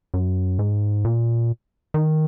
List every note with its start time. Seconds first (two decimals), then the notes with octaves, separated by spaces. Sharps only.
0.14 F#2
0.59 G#2
1.05 A#2
1.94 D#3